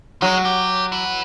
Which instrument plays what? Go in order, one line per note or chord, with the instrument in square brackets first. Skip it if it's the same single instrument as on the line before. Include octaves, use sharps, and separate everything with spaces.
[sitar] F#3 [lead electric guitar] G#3
[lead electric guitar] G4
E4 B4